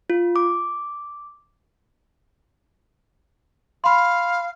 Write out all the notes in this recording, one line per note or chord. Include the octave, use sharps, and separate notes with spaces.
F4
D6
F5 B5 C6